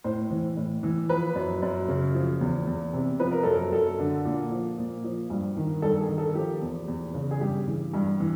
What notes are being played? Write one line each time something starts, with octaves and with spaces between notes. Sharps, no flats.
A2 C5
E3
A2
E3
F3 B4
F#2
F#2
C#3
F3
E2
E2
C3
F3 B4
A#4
F#2 A4
A#4
F#2 A4
D3
A#2
F3
A#2
F3
G2
D#3
G2 A4
G#4
D#3
A4
F3 G4
E2
E2
C#3
G#4
G2 G4
E3
G2
E3